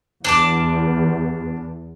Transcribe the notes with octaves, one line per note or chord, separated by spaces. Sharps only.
E2 D4 A5 D6